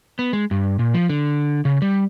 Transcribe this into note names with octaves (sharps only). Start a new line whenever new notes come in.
B3
G#3
G2
A#2
F3
D3
C#3
G3